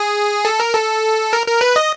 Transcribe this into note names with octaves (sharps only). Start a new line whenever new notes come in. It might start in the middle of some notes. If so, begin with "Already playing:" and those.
Already playing: G#4
A4
A#4
A4
A#4
A#4
B4
D#5